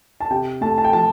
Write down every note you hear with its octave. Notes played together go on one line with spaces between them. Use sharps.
A5
C3 G5
A3 A5
A5
G5
F3 A5